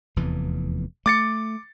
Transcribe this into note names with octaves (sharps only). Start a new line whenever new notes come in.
F1 E2 E3
A3 D6 A6 C#7